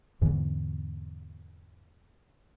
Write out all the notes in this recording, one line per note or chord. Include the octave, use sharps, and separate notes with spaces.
E2 G#2 D3 E3